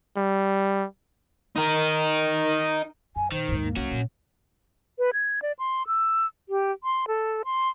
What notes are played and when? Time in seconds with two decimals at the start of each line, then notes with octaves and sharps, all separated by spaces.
0.17 G3
1.56 D#4 A#4
3.16 F#2 G#5
3.32 A#2 D#3 C5
3.48 D#2 G#2
3.63 A#3
3.77 C2 C#4 F#4
3.91 A#2
4.99 B4
5.13 G#6
5.42 D5
5.59 C6
5.87 E6
6.49 G4
6.84 C6
7.08 A4
7.45 C6